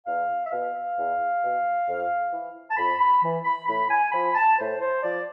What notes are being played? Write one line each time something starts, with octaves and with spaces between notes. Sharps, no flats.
E2 F5
E5
B2 F5
E2
B2
F2
E3
A5
F2 B5
B5
E3
B5
A2 B5
G#5
F3 B5
A5
A2 C5
C5
F3 D5